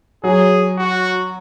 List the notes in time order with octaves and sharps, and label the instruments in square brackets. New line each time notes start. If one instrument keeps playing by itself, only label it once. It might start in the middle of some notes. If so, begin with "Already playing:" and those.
[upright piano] F#3 [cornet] G#4
[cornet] F#4